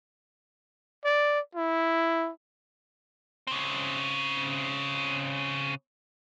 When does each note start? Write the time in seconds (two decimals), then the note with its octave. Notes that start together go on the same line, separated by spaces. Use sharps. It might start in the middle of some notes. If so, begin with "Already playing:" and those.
1.04 D5
1.55 E4
3.47 C#3 C4